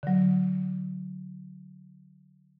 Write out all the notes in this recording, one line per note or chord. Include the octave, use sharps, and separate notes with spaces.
D3 F#3